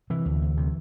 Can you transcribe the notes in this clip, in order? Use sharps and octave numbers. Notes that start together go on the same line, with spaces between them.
C3 E3
D2
D2
C3